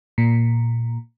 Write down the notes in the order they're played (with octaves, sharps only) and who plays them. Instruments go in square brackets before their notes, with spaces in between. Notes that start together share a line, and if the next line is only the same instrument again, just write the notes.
[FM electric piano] A#2